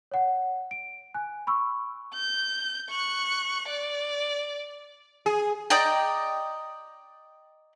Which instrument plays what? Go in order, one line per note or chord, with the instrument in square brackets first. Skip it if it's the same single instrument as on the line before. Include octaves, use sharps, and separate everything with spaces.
[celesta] C#5 F#5
D7
G#5 F#6
B5 C#6 E6
[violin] G6
C#6 F#6
D5
[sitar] G#4
[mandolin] D5 D#5 G5 A#5